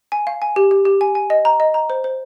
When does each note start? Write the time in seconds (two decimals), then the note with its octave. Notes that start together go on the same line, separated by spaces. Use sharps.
0.12 G#5
0.27 F5
0.42 G#5
0.56 G4
0.71 G4
0.85 G4
1.01 G#5
1.15 G#5
1.30 D#5
1.45 A#5
1.60 D#5
1.74 A#5
1.90 C5
2.04 C5